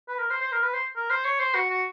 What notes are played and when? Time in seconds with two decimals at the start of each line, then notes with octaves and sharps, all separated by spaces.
0.08 B4
0.18 A#4
0.30 C5
0.41 C5
0.52 A#4
0.63 B4
0.73 C5
0.96 A#4
1.10 C5
1.25 C#5
1.39 C5
1.55 F#4
1.70 F#4